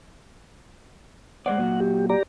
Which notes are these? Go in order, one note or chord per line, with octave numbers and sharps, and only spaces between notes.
G#3 C5 D5 F#5
A#2 F#3 F#4
G4
G4 D5 A#5